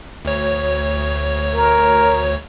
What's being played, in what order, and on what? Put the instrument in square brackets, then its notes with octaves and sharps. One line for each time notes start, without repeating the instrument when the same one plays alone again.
[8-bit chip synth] D2 C#5
[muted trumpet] A#4